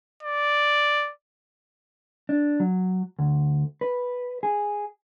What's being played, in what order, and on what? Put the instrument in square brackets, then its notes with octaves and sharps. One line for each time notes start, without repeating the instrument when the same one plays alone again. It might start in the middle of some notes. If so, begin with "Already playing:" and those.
[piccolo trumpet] D5
[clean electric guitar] D4
F#3
D2
B4
G#4